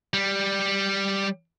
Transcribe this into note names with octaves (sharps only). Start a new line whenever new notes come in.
G3